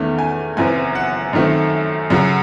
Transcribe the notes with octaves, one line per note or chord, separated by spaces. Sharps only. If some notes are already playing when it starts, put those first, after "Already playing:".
Already playing: E2 D#3 A3 C#4
G#5
F#1 F#2 E3 C4 G#5
F#5
F#2 D#3 A3 C4
F#2 C#3 F#3